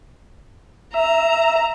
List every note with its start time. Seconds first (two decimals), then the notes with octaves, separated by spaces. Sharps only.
0.94 E5 A#5